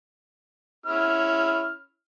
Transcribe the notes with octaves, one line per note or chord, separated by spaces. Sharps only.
C#4 E4 F6